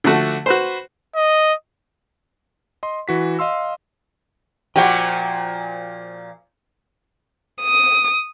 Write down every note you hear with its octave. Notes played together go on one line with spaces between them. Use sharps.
D3 F3 A3 F#4
F#4 B4 C5
D#5
D#5 C6
E3 F#4 B6
D#5 F5 C6 E6
A#2 F3 F#4 G4 F#5 G5
D#6